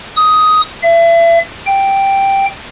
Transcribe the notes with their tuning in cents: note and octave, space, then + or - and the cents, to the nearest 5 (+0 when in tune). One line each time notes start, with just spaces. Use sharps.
D#6 +10
E5 +35
G5 +0